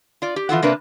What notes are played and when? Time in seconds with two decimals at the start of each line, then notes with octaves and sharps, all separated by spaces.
0.22 F4 D5
0.36 G4
0.49 E3 F4 A4 F#5
0.62 C3 A#3 D4 B4